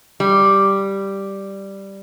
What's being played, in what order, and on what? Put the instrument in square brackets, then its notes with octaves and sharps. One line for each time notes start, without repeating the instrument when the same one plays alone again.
[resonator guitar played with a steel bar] G3